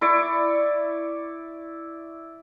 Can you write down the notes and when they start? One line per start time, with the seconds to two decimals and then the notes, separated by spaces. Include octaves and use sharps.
0.01 E4 D5 C#6